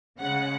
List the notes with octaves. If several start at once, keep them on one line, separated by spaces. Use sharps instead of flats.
C#3 G#3 F#5